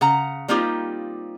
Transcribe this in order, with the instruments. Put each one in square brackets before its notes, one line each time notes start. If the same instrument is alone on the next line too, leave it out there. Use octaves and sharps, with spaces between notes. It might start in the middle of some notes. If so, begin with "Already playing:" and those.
[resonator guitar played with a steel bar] C#3 F#5 A#5
G3 A#3 C4 D#4 F4 G4